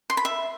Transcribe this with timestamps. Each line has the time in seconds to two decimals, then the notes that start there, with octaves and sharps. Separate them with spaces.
0.10 C6
0.17 B5
0.25 E5